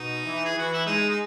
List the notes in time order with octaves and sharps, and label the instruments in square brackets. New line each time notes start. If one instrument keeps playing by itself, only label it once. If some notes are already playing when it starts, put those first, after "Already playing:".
Already playing: [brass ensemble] B2 [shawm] D#4
[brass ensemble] E3
[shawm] G#4
[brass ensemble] E3 [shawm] F#4
[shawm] E4
[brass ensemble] G#3 [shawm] D#4
[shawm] D#4